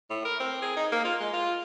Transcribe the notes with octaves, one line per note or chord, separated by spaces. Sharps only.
A2
A#4
C4
G#4
D#4
A#3
F4
G#3
F4